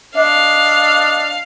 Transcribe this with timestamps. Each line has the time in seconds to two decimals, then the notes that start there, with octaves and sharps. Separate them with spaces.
0.17 D4 D#5 F5